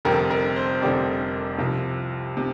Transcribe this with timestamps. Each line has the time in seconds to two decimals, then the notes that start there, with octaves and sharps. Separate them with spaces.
0.05 F1 F2 D3 G3 C4 A#4
0.30 A#4
0.56 C5
0.82 F1 F2 D3 G3 C4 D5
1.58 C2 C3 F3
2.37 C3